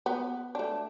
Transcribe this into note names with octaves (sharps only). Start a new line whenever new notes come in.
B3
A3 D4